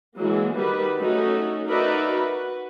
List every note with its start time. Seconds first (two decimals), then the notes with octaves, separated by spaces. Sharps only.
0.16 E3 F#3 G#3 A#3
0.55 D#3 G3 F#4 B4
0.99 F#3 A3 C#4 D#4 F#4
1.67 D#4 F#4 A#4 B4 D5 E5
2.13 F#4 B4